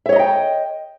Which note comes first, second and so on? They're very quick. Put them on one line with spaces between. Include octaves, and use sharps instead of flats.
E5 C#5 D#5 A#5 G5